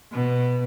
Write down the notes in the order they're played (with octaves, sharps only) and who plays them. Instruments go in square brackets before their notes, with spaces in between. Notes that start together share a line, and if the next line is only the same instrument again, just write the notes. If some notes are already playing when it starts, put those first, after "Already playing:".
[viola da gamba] B2